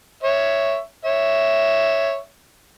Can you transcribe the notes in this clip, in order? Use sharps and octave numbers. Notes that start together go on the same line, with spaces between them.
C#5 E5
C#5 E5